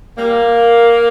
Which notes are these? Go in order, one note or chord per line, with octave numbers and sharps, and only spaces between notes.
A#2 G3 A#3